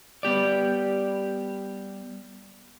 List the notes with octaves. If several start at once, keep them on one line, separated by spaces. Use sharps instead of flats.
G3 B3 G4 D5